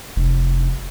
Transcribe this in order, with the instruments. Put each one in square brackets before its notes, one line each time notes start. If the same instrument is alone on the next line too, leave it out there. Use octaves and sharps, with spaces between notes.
[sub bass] F1